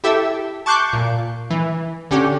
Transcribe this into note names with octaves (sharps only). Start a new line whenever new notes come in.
E4 G4 A4 E5
A5 C#6 D6 F#6 G6 C7
A#2
E3
D3 C#4 G4